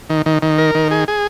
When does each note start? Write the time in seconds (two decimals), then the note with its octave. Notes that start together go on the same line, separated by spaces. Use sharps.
0.10 D#3
0.26 D#3
0.42 D#3
0.58 A#4
0.75 D#3
0.91 G#4
1.08 G#4